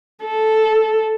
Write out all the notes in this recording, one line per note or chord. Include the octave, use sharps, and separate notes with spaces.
A4